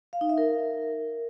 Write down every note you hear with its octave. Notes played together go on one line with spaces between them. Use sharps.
F5
D#4
E5
A#4